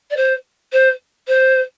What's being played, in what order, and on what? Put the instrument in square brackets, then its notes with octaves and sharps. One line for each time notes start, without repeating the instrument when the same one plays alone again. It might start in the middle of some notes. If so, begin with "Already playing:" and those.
[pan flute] D5
C5
C5
C5